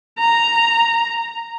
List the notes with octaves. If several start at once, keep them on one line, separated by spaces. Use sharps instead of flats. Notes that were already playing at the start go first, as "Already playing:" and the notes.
A#5